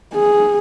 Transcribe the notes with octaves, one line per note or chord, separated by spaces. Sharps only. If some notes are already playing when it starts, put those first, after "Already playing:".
G#4